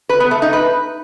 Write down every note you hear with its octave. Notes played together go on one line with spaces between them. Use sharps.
B4
B3
A3
D#4
B4